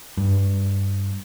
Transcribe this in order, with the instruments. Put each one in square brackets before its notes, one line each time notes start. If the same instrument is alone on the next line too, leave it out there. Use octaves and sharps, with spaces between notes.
[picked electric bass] G2